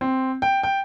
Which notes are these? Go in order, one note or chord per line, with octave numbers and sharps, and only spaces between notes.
C4
G5
G5